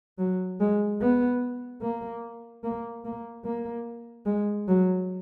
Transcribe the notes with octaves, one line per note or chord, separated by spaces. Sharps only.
F#3
G#3
B3
A#3
A#3
A#3
A#3
G#3
F#3